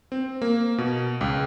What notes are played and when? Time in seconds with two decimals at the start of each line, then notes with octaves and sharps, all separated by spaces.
0.12 C4
0.42 A#3
0.78 B2
1.21 C#2